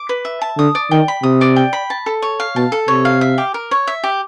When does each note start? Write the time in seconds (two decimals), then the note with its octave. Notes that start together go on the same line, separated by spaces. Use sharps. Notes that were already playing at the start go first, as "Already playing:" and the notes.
Already playing: D6
0.09 B4
0.25 E5
0.42 A5
0.58 D3 D#6
0.75 D5
0.91 D#3 G5
1.08 B5
1.23 C3 D#6
1.41 D5
1.56 G5
1.73 B5
1.90 A5
2.06 A4
2.22 C#5
2.40 F5
2.56 B2 A5
2.72 A4
2.88 C3 C#5
3.05 F5
3.21 E5
3.38 G4
3.54 A#4
3.71 C#5
3.87 E5
4.04 G4